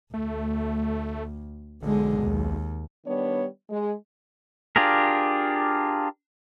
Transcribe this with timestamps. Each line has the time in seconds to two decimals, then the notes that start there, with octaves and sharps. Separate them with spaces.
0.14 D2 A3
1.82 B1 D3 G#3
2.23 D#2
3.06 D#3 G3 B3 D4 C#5
3.70 G#3
4.76 D4 F4 G4 G#4 A#4